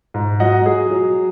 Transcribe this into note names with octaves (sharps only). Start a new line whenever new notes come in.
G#2
F#3 D#5 F#5
F#3 G#4
F#3